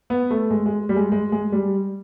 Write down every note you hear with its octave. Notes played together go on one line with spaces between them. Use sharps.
B3
A3
G#3
G#3
G3
G#3
G#3
G#3
G3